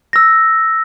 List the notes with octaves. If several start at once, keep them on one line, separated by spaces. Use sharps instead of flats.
E6 A#6